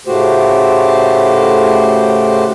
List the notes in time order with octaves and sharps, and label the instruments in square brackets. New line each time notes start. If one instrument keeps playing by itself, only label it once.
[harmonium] A2 C#3 A3 F#4 G4 C5